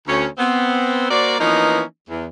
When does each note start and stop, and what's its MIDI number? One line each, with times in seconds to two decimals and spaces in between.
0.07 0.27 38
0.07 0.27 61
0.38 1.06 59
0.38 1.06 60
1.10 1.36 58
1.10 1.36 66
1.10 1.36 70
1.10 1.36 72
1.10 1.36 74
1.39 1.82 52
1.39 1.82 53
1.39 1.82 58
1.39 1.82 59
1.39 1.82 61
1.39 1.82 63
2.09 2.26 40